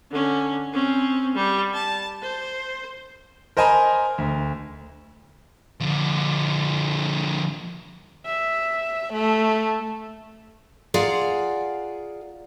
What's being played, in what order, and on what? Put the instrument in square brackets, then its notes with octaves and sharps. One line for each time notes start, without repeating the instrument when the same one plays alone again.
[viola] D3 C#4
C4 C#4
G3
A5
C5
[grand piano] A#4 C5 D#5 G#5 A#5 B5
D2
[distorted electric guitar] D3 F3
[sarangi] E5
A3
[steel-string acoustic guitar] F4 G#4 D5 F5 F#5 A#5